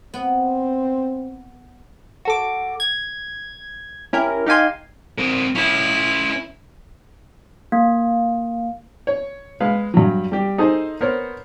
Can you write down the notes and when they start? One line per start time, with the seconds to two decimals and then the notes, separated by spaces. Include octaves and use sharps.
0.14 B3 C4
2.25 F#4 A4 D6
2.80 G#6
4.13 C#4 E4 G4 A#4
4.46 D#4 G4 F5 G#5 C6
5.18 C4 A#4
5.55 C#4 E4 B4
7.72 A#3
9.07 C#5
9.60 G#3 B4 F5
9.94 G2 F#3
10.32 G3 G4
10.58 D#4 G#4 A4 C5
11.01 B3 A#4 C5 C#5